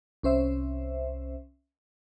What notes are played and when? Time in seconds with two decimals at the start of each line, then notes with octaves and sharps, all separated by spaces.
0.23 C2 C#4 C5 E5